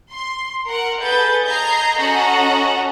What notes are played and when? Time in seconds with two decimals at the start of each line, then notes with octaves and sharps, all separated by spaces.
0.12 C6
0.67 A#4 F#5
1.02 G#4 A4 B4 G6 A6
1.45 D#5 A#5 G6 G#6 C7
1.96 C#4 F#4 A4 D#5 F#5 A#5